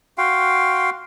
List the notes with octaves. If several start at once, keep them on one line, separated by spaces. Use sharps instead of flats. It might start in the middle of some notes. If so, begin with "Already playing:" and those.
F#4 F5 G5 C6